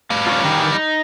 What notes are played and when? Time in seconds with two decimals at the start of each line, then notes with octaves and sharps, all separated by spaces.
0.10 G3 F5
0.26 C#4 F4
0.43 D#3 E3
0.72 D#4